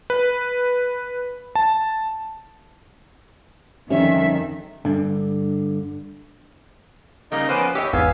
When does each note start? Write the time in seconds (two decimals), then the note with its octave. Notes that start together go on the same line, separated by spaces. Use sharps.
0.10 B4
1.55 A5
3.90 F2 D3 D#3 G3 C#4 E5
4.85 G2 D3
7.32 C#3 G3 A#3 D#4 D#5
7.49 F3 A#3 B3 C#4 B4 C5 D7 D#7
7.75 D#2 G4 C#5 D#5 E6
7.93 G#1 E2 B3 F5 G#5 E6